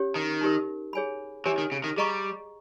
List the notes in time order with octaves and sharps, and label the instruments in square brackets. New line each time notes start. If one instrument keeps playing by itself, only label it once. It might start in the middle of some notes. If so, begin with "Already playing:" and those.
Already playing: [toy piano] C#4 G4 C#5
[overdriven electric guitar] D#3
[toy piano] D#4 G4 A#4
G#4 C#5 G#5 B5
[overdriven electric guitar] E3 [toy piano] G4 C#5 G#5
[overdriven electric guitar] D#3
C#3
D#3
[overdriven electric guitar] G3 [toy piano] G#4 D#5 A#5 C#6